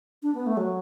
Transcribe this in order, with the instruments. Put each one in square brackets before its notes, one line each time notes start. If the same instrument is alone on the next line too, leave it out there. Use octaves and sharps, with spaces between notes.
[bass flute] D4
B3
A3
F#3